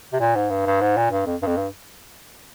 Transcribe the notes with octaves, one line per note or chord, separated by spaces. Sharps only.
C3
A#2
G#2
G2
G2
G#2
A#2
G2
F2
G2
F2
G2